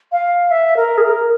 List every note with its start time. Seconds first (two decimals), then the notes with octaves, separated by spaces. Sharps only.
0.12 F5
0.51 E5
0.76 A#4
0.98 G#4
1.03 A#4